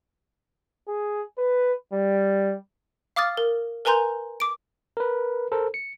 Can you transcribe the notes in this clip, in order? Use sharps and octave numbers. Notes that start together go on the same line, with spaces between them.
G#4
B4
G3
F5 D6 D#6 F6 A6
A#4
A#4 B4 G#5 A#5 C6 G6
D6 D7
A#4 B4
A4 A#4 C5
C#7